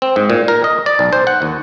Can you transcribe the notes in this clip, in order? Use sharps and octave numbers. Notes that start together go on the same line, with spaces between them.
C4
G#2
A#2
A#4
D#5
D5
B1
C5
F#5
D#2